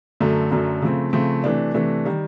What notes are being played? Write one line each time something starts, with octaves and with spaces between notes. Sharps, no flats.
F#2 D3 F#3 A3
F#2 D3 F#3 A3
C#3 F3 A3 C4
C#3 F3 A3 C4
C3 E3 A3 D4
C3 E3 A3 D4
D#3 G3